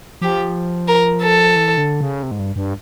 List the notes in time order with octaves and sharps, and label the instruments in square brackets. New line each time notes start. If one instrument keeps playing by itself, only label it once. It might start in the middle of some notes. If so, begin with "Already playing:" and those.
[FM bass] F3 [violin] G4
[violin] A#4
A4
[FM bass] E3
D3
C#3
C3
G#2
G2
G2